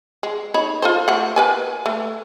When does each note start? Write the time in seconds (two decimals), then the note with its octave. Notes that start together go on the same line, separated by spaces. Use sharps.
0.23 G#3
0.54 D#4 C#5 B5
0.82 F4 A4 C5
1.08 A3 F#5
1.36 A#4 B4 G#5
1.86 A3